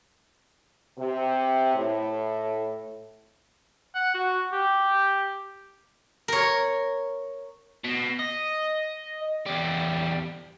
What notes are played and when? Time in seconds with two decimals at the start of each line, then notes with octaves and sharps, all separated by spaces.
0.97 C3
1.74 A2
3.95 F#5
4.14 F#4
4.53 G4
6.28 A#4 C#5
7.84 B2
8.19 D#5
9.46 E2 G3